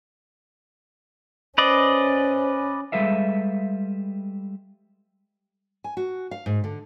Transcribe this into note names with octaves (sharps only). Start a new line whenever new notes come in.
C#4 B4 C5 D5 D#5
G3 G#3 A4 B4 E5 F5
G#5
F#4
F5
G#2
D3